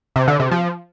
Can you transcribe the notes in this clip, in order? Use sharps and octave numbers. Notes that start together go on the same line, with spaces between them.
C3
D3
C3
F3